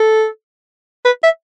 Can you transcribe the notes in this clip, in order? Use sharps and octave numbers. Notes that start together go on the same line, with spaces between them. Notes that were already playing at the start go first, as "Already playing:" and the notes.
Already playing: A4
B4
E5